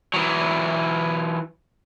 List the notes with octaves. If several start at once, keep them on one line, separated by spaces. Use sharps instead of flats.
E3 F#3